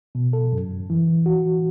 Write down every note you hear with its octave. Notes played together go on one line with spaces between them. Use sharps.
B2
A4
F#2
F#2
E3
E3
F#4
E3